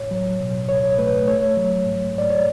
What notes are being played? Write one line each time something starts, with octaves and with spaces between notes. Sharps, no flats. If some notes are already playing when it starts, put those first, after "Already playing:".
Already playing: A2 C#5
F#3
B2
C#2 C#5
A3 B4
A3 C#5
F#3
G#2
G#2 D5
C#5